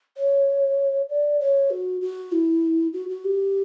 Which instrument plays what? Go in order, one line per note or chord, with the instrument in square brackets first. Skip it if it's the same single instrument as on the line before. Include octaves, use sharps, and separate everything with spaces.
[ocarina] C#5
D5
C#5
F#4
F#4
E4
F#4
F#4
G4